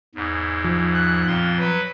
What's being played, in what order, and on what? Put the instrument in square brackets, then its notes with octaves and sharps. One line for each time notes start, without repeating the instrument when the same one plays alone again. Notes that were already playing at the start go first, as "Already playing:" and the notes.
[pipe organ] E2 G#2
[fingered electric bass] F3
[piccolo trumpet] F#6
[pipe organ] F2 A#2 C6 [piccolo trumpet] F5
[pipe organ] F#3 [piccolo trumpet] B4